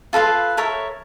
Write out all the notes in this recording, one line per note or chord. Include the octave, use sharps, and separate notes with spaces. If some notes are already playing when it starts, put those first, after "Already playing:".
F4 A4 B4 F5
A4 A#4 C#5 E5